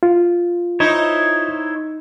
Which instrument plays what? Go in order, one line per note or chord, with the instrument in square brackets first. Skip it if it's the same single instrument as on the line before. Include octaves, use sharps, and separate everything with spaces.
[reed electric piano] F4
[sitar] D#4 [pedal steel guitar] E4 C5 C#5